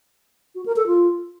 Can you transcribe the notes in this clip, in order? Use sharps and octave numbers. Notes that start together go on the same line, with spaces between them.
F#4
A#4
A4
F4